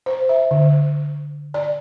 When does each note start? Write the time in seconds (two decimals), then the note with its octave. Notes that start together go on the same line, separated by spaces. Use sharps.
0.06 C5
0.29 E5
0.51 D3
1.54 D5